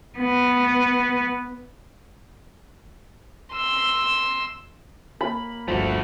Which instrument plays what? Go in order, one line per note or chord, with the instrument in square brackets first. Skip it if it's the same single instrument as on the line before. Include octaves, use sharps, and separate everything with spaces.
[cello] B3
[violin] C6 E6
[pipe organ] A#3 [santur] B5
[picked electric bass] G1 D2 F3 [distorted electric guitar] A3 F#4